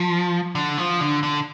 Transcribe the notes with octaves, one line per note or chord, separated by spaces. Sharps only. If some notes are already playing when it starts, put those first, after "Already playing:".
Already playing: F3
D3
F3
D3
D3